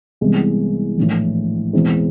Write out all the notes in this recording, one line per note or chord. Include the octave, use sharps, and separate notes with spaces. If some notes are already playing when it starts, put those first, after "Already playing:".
C2 C3 E3 G#3 B3
A#1 A2 E3
E2 B2 G#3 C4 E4